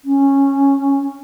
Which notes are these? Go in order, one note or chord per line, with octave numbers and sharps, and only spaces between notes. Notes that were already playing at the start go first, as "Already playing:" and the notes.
C#4